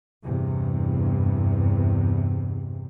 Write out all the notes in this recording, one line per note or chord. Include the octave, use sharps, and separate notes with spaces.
E2 G2 C3